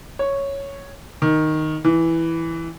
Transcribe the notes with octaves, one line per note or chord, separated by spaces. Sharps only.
C#5
D#3
E3